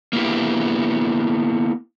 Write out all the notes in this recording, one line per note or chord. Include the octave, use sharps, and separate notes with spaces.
A#3 B3 E4 G4